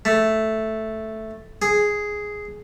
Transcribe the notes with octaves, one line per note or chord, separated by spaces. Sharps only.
A3
G#4